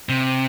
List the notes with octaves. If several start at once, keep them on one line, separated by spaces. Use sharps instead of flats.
C3